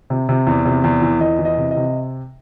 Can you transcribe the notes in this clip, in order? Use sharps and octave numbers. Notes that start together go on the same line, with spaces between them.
C3
C3
E2
C3
E2
E3
E2 D#5
E3
D#5
C3
D#5
C3